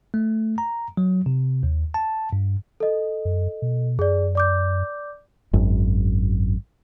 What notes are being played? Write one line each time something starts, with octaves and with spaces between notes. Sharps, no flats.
A3
A#5
F#3
C3
D#2
A5
G2
A4 D#5
F#2
B2
F#2 G#4 D5
D5 D6 G6
G#1 F#2